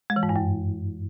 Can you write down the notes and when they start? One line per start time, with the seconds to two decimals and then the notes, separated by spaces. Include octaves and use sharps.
0.10 G#3
0.16 E3
0.23 G#2
0.29 G2
0.36 F#2